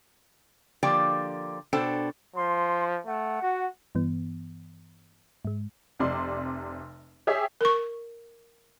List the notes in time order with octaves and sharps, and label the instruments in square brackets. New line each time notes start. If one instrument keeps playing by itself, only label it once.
[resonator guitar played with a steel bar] D3 F3 A#3 G4 D5 G5
B2 D4 A4 C5 G5
[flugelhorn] F3 [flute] C6
[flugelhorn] A3 [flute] F#5
[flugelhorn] F#4
[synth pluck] G2 E3 B3
G#2 G#3
[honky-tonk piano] F1 C3 D5 C6
G4 G#4 C#5 E5 G5
[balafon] A#4 C#6